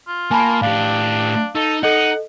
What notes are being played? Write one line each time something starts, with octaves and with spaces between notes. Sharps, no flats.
F4
A#3 G#5 A5 B5
A2 D4 G4 F5
D#4 A4
D#4 A4 D#5 F#5